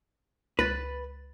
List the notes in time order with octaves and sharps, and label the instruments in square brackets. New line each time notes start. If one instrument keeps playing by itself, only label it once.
[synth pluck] C#2 A6 [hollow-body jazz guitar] B4